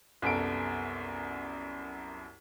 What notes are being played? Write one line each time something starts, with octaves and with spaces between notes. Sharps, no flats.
C2 F#2 B3 A4 D7